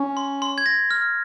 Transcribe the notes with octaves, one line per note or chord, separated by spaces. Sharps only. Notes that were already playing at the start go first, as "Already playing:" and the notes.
Already playing: C#4
C6
C6
G#6
A#6
F6